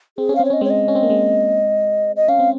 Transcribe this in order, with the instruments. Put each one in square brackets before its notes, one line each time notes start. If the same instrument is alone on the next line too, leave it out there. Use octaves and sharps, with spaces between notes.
[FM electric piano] C4 [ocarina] G#4
[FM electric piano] C#4
[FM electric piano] C4 [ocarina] F5
[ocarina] C#5
[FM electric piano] C#4 [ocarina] D#5
[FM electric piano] G#3 C4 [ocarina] C#5
[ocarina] D#5
[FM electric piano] C#4
C4
A#3
G#3 C4
[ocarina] D#5
[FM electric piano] C#4 [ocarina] F5
[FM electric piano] C4